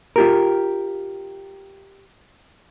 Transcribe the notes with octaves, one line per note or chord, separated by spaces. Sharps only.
F4 G4 A#4